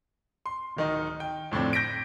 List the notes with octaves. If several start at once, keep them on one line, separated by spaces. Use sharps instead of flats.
C6
D1 D#3 D#4
G5
F2 A2 D3 C4 D4
G6 A#6 B6 D7